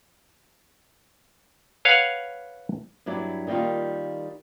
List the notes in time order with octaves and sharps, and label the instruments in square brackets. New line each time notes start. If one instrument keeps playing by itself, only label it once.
[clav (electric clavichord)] B4 C#5 F5 F#5
[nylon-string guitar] G2 F#3 E4 D5
D#3 G3 A#3 D#4 F4